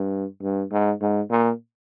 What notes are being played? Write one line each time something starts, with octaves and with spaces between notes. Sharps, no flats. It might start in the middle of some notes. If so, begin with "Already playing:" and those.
Already playing: G2
G2
G#2
G#2
A#2